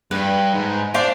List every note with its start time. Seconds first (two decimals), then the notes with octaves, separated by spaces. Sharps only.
0.11 G2 B4
0.54 G#2
0.94 D4 C5 F5 D6